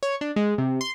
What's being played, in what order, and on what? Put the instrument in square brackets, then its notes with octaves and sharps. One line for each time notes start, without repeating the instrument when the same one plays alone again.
[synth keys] C#5
D4
G#3
C3
C6